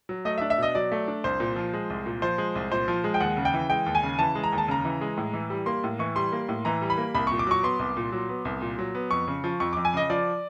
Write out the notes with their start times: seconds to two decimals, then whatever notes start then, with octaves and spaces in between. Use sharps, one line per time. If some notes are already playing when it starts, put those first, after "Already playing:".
0.09 F#3
0.25 A3 D#5
0.38 E5
0.41 D4
0.50 E5
0.58 B2 D#5
0.75 F#3 D5
0.92 A3
1.08 D4
1.24 C2 C5
1.40 A#2
1.56 F3
1.73 G#3
1.90 C2
2.06 A#2
2.22 F3 C5
2.38 G#3
2.55 C2
2.71 A#2 C5
2.88 F3
3.04 G#3
3.14 G5
3.20 D#2 F#5
3.37 C#3
3.45 G5
3.54 E3
3.70 G#3 G5
3.86 D#2
3.95 G#5
4.03 C#3
4.19 E3 A5
4.35 G#3
4.44 A#5
4.52 D#2
4.58 A5
4.68 C#3 A#5
4.85 E3
5.01 G#3
5.17 A2
5.34 E3
5.50 G3
5.66 A#3 C6
5.84 A2
5.99 E3 C#6
6.16 G3 C6
6.32 A#3
6.49 A2
6.65 E3 A#5
6.82 G3
6.90 B5
6.98 A#3
7.14 C2 B5
7.27 A#2 C#6
7.39 D6
7.47 F#3 C#6
7.63 B3 C6
7.79 C2
7.97 A#2
8.12 F#3
8.29 B3
8.45 C2
8.61 A#2
8.79 F#3
8.95 B3
9.11 F2 C#6
9.28 C#3
9.44 F3
9.60 F2 C#6
9.73 F2 D6
9.85 G#5
9.94 C#3 D#5
10.10 F3 D5